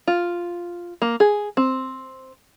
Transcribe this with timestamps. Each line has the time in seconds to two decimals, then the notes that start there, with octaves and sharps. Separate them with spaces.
0.08 F4
1.02 A#3
1.20 G#4
1.57 C4